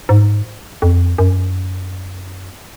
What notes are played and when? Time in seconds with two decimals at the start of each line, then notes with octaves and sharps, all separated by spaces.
0.09 G#2
0.82 F2
1.18 F#2